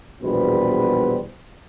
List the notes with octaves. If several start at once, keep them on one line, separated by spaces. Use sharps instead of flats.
A#1 E2 B2 G3 B4 C5